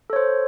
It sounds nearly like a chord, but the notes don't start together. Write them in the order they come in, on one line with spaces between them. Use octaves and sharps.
A4 C#5 C5